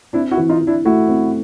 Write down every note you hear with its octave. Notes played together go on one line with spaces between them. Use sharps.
C4 D4 E4
E4 F#4
E3
D#4 F4
E3
D4 E4
A3 E4 F#4
C4